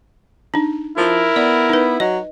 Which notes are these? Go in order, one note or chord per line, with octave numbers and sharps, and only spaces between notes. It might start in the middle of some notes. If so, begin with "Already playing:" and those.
D4 D#4
F3 E4 A#4
B3 D5
D#4 B4
F#3 D#5